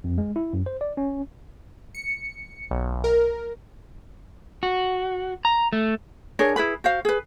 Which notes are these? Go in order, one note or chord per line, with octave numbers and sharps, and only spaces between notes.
F2
G#3
E4
F#2
C5
D5
C#4
C#7
B1
A#4
F#4
A#5
A3
D4 G#4 A#4 C#5
E4 G#4 B4 B5
F#4 C5 F5
G#4 B4